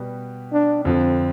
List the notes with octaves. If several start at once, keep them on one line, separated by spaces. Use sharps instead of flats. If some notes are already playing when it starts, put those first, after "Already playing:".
Already playing: B2 G3 B3
D4
F2 D3 F3 C4